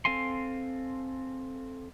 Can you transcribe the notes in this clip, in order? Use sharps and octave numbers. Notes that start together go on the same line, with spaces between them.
C4 A4 F5 G#5 C6